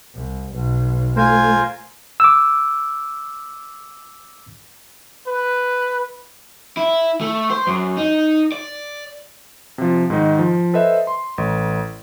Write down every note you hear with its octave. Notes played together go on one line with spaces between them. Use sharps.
C2
B1
A3 F4 A#4 C5 G#5
D6 E6
B4
E4
A3
C5
F#2
D#4
D5
C3 F3
G#2 D#3 D#4
F3
A4 B4 C5 D#5 E5
C6
A1